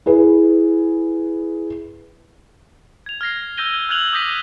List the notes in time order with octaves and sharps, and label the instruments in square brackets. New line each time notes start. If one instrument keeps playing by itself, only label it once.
[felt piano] E4 G#4 B4
[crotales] G#6 F7
F6 G#6 A#6 C7
E6 G6 G#6 A#6 D#7 G7
F6 F#6 G#6 F7 F#7
D6 D#6 G6 A#6 B6 D#7